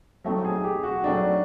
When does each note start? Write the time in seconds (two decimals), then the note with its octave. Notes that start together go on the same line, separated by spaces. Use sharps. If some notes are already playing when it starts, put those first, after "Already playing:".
0.24 F#3 A3 C4 D#4
0.45 G#4
0.64 G4
0.83 F#4
1.03 F#3 A3 C4 D4 D#4